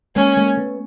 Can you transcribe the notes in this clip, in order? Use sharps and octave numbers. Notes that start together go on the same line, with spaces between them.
G#3 A#3 C#4
G#3 A#3
A3 B3